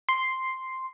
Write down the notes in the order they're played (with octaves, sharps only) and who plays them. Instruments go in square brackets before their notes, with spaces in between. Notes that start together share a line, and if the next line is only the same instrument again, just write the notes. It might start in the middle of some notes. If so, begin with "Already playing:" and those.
[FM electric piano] C6